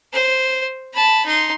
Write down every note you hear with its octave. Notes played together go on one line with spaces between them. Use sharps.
C5
A5 B5
D#4 C6